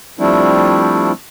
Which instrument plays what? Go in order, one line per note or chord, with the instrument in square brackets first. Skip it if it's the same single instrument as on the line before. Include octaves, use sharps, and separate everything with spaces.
[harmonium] F3 G3 A3 C4 D4 E4